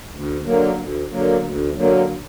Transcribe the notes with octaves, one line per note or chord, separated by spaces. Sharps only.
D2
D3 F#3 A#3
D2
D3 F#3 A#3
D2
D3 F#3 A#3